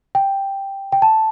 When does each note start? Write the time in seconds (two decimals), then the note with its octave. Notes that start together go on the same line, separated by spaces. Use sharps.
0.15 G5
0.92 G5
1.02 A5